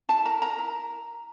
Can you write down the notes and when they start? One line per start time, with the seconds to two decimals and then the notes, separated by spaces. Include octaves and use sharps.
0.09 E4 A5
0.25 A#4 A#5
0.42 A#4 A#5
0.59 E4